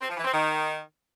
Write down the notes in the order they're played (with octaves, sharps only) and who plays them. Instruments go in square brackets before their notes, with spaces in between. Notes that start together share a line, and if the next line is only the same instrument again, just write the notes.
[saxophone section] C4
F3
E3
C4
D#3